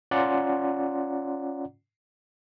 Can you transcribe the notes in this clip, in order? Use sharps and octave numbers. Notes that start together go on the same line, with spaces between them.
C#4 F4 D5 F#5 A#5 C6